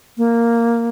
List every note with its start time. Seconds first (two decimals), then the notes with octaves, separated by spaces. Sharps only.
0.18 A#3